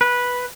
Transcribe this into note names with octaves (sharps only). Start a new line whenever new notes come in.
B4